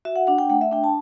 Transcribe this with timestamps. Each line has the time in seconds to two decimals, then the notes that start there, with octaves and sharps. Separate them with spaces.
0.05 F#4 E5
0.16 F#5
0.27 D4 F#5
0.38 G5
0.50 A3 F#5
0.61 E5
0.71 D4 G5
0.84 A5